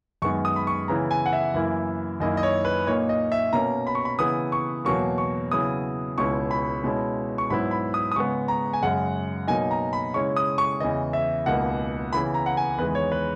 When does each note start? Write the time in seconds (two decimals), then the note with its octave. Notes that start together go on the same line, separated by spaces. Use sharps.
0.22 F#2 D#3 G#3 B3 C#6
0.45 D#6
0.56 B5
0.67 C#6
0.88 C#3 E3 B3 E4 A#5
1.11 G#5
1.26 F#5
1.33 E5
1.54 F#2 E3 A#3 E4
2.20 F#2 D#3 A#3 E4 D#5
2.37 D#5
2.43 C#5
2.65 B4
2.87 A#2 A#3 D#4 C#5
3.09 D#5
3.32 E5
3.53 B2 A#3 C#4 A#5
3.87 B5
3.95 C#6
4.05 B5
4.19 C#3 E3 B3 E4 D#6
4.52 C#6
4.85 E2 B2 F#3 A#3 C#6
5.18 C#6
5.52 C#3 F#3 B3 E4 D#6
6.18 C#2 B2 G#3 C#4 E4 C#6
6.51 B5
6.84 B2 G#3 C#4 E4
7.38 C#6
7.50 G#2 F#3 B3 E4 B5
7.71 B5
7.94 D#6
8.12 D#6
8.16 C#3 G#3 B3 C#6
8.48 A#5
8.73 G#5
8.82 F#2 C#3 G#3 F#5
9.48 B2 F#3 A#3 D#4 G#5
9.71 A#5
9.93 B5
10.14 C#3 G#3 C#4 E4 C#6
10.37 D#6
10.58 C#6
10.80 E2 C#3 E3 D#5
11.13 E5
11.46 C#2 B2 A#3 D#4 F#5
12.13 C#3 E3 B3 E4 B5
12.34 A#5
12.46 F#5
12.57 G#5
12.79 E2 D#3 G#3 B4
12.95 C#5
13.12 B4